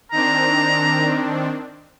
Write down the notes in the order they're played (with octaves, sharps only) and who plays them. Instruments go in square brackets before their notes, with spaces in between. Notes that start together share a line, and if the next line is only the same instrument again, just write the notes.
[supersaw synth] D#3 C4 D4 [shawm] A#5